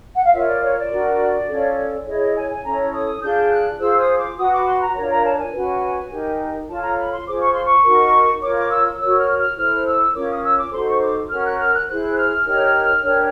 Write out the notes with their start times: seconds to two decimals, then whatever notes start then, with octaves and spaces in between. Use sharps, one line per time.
0.15 F#5
0.24 F5
0.33 F4 A#4 C#5 E5
0.48 D5
0.62 C#5
0.77 D5
0.91 D4 F#4 A#4
1.48 C#4 F4 A4 C#5
2.06 E4 G#4 C#5 D#5
2.20 D#5
2.35 G#5
2.50 G#5
2.64 C#4 E4 A4 C#5 A#5
2.93 D#6
3.21 D4 F4 G#4 G6
3.50 F#6
3.79 F4 G#4 C5 E6
3.98 D#6
4.18 D6
4.37 F#4 B4 D#6
4.51 D6
4.66 C6
4.80 A#5
4.95 D4 F4 A#4 C#5 A#5
5.09 A#5
5.24 A5
5.38 G#5
5.52 C#4 F#4 B4
6.10 D#4 G4 A#4
6.68 F4 A4 C#5 A5
6.82 A#5
6.97 B5
7.11 C6
7.25 F4 G#4 C5 D6
7.38 C#6
7.51 C6
7.64 C#6
7.83 D#4 F#4 A#4
8.41 F4 A#4 C#5 D6
8.55 D6
8.70 E6
8.84 E6
8.99 F#4 A#4 C#5 E6
9.18 F6
9.37 F6
9.56 E4 A4 C5 F6
9.85 E6
10.14 C#4 F4 A#4 C#5 D6
10.29 D#6
10.43 E6
10.57 D6
10.72 D#4 F#4 A4 C5 C6
10.86 C#6
11.01 D6
11.29 C#4 F#4 A#4 F6
11.44 F#6
11.58 F6
11.73 F#6
11.87 E4 G#4 C5 F#6
12.16 F6
12.45 D#4 G4 A#4 C#5
13.02 D4 G4 A#4 C#5